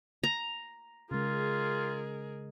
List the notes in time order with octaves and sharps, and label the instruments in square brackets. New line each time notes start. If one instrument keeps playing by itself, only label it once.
[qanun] A#5
[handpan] C#3 G#3 [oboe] F4 [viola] G#4 A#4